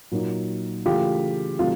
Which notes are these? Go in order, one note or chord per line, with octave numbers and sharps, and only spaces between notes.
A#2 F#3 A#3 D#4
C#3 E3 A3 F4 G4
C3 D#3 F#3 A3 F4